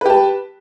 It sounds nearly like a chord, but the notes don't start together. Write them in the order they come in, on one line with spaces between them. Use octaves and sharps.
B4 G4 A5